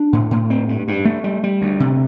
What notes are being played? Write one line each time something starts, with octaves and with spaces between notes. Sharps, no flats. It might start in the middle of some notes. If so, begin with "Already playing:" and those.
Already playing: D4
A2
A2
C4
G2
G2
A3
G3
G3
D2
C3